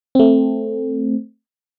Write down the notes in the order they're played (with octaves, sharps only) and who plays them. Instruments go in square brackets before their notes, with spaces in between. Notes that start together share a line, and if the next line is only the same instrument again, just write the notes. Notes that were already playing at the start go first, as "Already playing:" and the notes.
[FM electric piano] A3 C4